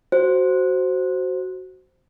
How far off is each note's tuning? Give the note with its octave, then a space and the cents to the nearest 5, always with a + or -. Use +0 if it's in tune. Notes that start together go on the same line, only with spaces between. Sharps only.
F#4 +10 C5 +0